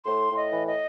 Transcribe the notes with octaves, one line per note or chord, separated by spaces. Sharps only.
A2 C6
A2
D#5
E3
D#5